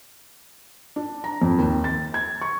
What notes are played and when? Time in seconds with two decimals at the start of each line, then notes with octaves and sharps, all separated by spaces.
0.96 D4
1.24 A#5
1.42 F2
1.58 D#2
1.84 A6
2.14 G#6
2.41 C#6